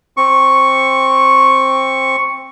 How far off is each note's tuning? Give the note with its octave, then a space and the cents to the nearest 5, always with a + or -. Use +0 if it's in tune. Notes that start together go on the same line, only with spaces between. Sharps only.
C4 +15 C#6 +0